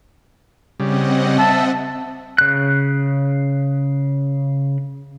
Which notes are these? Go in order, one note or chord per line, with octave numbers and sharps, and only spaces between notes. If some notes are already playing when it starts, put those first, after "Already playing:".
C#3 G3 C4 D#5 F#5
E5 A5
C#3 F#6